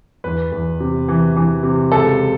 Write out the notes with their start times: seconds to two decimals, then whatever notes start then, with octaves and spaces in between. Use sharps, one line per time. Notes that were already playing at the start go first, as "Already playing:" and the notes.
0.24 E2 B4
0.52 E2
0.80 C3
1.08 E3
1.36 E3
1.63 C3
1.92 C#2 A4